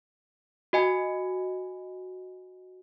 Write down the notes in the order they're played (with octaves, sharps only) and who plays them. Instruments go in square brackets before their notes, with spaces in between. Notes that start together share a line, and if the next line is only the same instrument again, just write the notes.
[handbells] F#4 D#5 G#5